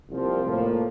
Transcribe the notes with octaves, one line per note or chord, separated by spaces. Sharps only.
C2 A#2 F3 C4
A2 F3 A#3